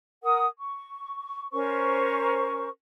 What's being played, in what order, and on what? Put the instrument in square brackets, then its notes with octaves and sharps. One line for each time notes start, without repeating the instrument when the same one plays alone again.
[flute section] A#4 F#5 D#6
C#6
C#4 A#4 C5 C#6